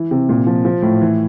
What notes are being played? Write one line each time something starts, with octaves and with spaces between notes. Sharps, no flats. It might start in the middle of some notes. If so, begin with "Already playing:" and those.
Already playing: E3
C3
A#2
F3
F3
A2
E3